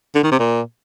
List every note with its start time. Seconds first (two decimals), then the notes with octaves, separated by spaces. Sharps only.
0.15 D3
0.24 D#3
0.32 C3
0.39 A#2